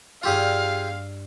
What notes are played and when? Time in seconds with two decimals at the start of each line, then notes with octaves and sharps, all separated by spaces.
0.23 G2 F4 G4 G#4 F5 E6 G6